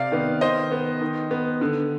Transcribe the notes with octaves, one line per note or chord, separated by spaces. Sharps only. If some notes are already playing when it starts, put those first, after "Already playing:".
Already playing: C3 D5 F5
D#3 B3
D#3 C5 D#5
B3
D#3
B3
D3